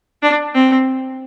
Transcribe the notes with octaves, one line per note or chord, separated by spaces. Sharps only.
D4
C4